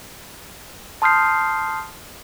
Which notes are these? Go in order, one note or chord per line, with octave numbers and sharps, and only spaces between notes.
A5 C6 D#6 F6 G6 C7